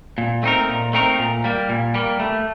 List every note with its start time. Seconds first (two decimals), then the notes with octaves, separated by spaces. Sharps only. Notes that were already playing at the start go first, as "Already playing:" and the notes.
0.18 A#2
0.43 A3 C4 D#4 A#4
0.69 A#2
0.93 A3 C4 D#4 A#4
1.19 A#2
1.44 G3 A#3
1.69 A#2
1.94 G3 A#3
2.20 A3